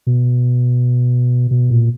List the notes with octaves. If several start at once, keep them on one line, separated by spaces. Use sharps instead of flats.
B2
B2
A#2